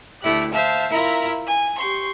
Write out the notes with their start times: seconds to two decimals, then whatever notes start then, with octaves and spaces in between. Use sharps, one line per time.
0.22 D2 A3 E4 G4 F#6
0.52 C5 E5 F5 A5
0.91 E4 F4 A#4 E5 A#5 B5
1.46 G#5
1.77 G4 C6 C#6